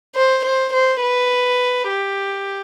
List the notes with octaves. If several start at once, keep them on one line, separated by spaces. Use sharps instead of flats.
C5
C5
C5
B4
G4